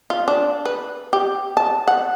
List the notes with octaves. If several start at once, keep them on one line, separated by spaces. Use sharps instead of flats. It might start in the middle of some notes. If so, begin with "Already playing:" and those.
F4
D4
B4
G4
A5
F#5